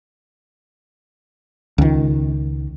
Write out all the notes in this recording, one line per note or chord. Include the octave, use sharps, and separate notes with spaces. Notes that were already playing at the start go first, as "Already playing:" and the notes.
C#2 D#3